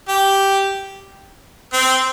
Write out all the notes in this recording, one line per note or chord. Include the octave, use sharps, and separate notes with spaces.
G4
C4